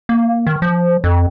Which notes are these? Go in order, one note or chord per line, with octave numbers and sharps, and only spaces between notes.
A#3
D#3
F3
F2